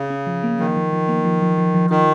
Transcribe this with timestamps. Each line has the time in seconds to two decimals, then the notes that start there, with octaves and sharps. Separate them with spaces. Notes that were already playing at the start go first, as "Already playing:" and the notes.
Already playing: C#3
0.10 C#4
0.27 F3
0.43 A#3
0.59 D#3 F3
0.77 F3
0.93 F3
1.08 A#3
1.25 F3
1.42 F3
1.58 F3
1.74 F3
1.90 D#3 F4